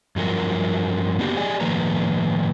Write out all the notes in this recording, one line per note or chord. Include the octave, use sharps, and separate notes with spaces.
G2 F3 F#3 A#4
A#3 B3 D4 F#4 G4
G4 G#4 D5 D#5 G#5
A2 D#3 F3 A#3 B4 A#5